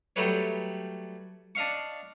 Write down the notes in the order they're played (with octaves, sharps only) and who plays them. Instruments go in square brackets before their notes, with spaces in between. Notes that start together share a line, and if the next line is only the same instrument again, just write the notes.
[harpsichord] F#3 G3 A3 G4 B4 C#5
D4 D#5 F5 C#6